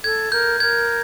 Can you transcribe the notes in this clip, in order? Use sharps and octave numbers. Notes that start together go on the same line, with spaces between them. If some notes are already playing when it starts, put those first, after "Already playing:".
A4 G#6
A#4 G6
A#4 G#6